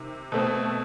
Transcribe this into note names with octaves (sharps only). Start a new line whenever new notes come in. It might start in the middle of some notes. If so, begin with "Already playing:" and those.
Already playing: C3 D#3
B2 A3 C4